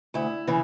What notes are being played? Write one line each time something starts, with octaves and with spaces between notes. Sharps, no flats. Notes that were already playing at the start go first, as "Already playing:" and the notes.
D2 E4
C#3 E3